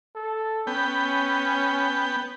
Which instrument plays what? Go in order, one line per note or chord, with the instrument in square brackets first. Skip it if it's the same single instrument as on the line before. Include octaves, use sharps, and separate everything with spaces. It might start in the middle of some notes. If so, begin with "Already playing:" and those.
[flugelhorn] A4
[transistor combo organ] B3 G5 [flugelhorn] C#4